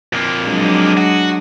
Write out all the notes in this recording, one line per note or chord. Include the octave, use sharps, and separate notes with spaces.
F2 A#3
F#3 G#3 D4
F#4